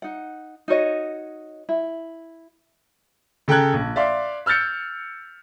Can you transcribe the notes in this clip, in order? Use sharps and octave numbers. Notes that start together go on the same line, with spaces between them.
D#4 F#5
D#4 F#4 C#5 D#5
E4
C#3 A4 G5 A#5 F#6 G#6
A#1
D5 E5 F5 C6 D6
E6 F6 G6 A6 C#7